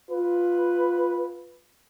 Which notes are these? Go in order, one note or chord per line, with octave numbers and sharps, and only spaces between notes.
F4 B4